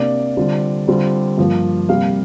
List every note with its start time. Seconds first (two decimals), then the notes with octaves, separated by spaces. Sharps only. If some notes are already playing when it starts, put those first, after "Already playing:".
Already playing: C3 A#3 D4 D5
0.37 D3 G3 C4 F4
0.88 D3 G3 C4 F4
1.38 G2 F3 A#3 F4
1.89 C3 G3 A#3 F5